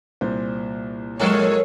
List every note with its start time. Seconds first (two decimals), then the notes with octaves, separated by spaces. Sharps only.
0.21 C2 A#2 C5
1.19 F3 F#3 G#3 A4 A#4 C#5